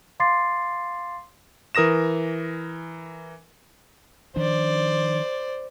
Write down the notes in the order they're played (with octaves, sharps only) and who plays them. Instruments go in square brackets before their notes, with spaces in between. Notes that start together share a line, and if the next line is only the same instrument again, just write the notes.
[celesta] F5 C6 D6 A6 C7
[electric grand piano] E3 A#4 D#6 A#6 E7
[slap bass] D#3 F3 D4 [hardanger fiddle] C5 D5